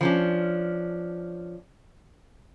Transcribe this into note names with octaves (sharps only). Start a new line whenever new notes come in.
F3 C#4 D4